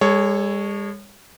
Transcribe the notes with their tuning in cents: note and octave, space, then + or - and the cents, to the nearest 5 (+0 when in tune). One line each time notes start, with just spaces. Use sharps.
G#3 -45 A4 +0 C#5 +0